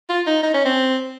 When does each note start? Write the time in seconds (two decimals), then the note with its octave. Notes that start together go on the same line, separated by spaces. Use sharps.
0.09 F4
0.26 D#4
0.43 D#4
0.54 C#4
0.65 C4